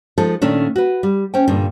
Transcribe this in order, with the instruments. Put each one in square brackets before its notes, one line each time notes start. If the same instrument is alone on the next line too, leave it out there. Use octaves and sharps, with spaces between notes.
[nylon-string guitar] F3 G#3 D#4 A4
A#2 D#3 A3 C#4 D4
F#4 B4
G3
C#4 C5 G5
G2 A#2 D3